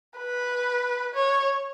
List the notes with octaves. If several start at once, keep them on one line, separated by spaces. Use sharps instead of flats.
B4
C#5